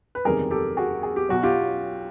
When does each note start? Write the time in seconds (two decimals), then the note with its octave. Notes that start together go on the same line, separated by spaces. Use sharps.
0.15 B4
0.25 F#1 E2 C3 D#3 G3 G#4 A#4
0.51 G4 A4
0.77 F#4 G#4
1.03 G#4
1.16 G4
1.29 B1 B2 F#3 F#4
1.43 F4 G4